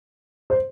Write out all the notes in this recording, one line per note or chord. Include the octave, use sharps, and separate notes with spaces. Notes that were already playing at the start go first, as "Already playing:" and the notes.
C5